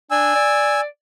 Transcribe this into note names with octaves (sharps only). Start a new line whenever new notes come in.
D4 G#5 E6
D5